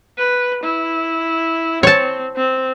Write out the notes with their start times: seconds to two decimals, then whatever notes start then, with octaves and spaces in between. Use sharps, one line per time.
0.18 B4
0.64 E4
1.83 C4 C#5 A5
2.36 C4